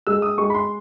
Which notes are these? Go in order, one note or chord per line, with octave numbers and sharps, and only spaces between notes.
G#3 E6
D#6
G#3 C#6
B5
C6